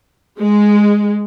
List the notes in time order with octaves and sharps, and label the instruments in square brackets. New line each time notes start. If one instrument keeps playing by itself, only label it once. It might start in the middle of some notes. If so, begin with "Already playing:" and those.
[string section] G#3